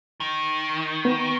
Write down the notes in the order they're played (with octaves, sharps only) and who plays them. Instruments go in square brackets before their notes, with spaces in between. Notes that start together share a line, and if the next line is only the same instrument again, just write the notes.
[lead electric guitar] D#3
[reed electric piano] B3